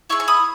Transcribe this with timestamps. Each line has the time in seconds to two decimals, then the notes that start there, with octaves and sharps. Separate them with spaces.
0.10 E4 G#4 C#6 E6
0.20 C#6
0.28 B5 D#6